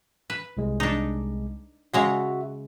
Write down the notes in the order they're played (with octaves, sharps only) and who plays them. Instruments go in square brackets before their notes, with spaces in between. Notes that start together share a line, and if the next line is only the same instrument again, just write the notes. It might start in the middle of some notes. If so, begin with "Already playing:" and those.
[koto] B4
[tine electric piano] C2 G#3
[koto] D4 D#4
[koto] C#3 G#3 A#5 [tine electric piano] F#4 E5